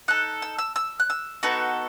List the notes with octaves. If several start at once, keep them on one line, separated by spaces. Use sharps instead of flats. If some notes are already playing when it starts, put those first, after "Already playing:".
D#4 A4 F#6
E6
E6
E6
F#6
E6
B3 D#4 F#4 A4